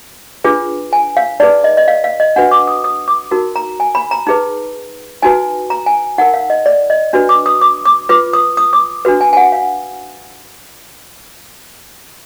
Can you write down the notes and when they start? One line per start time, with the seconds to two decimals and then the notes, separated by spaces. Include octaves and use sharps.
0.44 D4 F4 G#4 B4
0.93 G#5
1.17 F5
1.40 D#4 G#4 B4 D5
1.64 D#5
1.77 D#5
1.88 F5
2.04 F5
2.20 D#5
2.36 D4 F#4 B4 F#5
2.51 D6
2.67 D#6
2.84 D#6
3.08 D6
3.31 D#4 F#4 A#4
3.56 A#5
3.80 G#5
3.95 B5
4.11 A#5
4.27 D#4 G#4 B4
5.22 D#4 F#4 B4 G#5
5.70 A#5
5.86 G#5
6.18 D#4 A#4 F#5
6.34 F5
6.50 D#5
6.66 D5
6.90 D#5
7.13 D4 F#4 B4
7.29 D6
7.46 D#6
7.61 D6
7.85 D6
8.09 F4 B4 D6
8.33 D#6
8.57 D#6
8.73 D6
9.05 D4 F#4 B4
9.21 G#5
9.33 G#5
9.37 F#5
9.52 F5